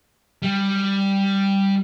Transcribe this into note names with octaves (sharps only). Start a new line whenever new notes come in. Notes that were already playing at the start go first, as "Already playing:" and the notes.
G3